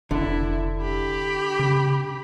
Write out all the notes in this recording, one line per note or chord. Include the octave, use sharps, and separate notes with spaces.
F1 D3 E4
G4 B5
C#3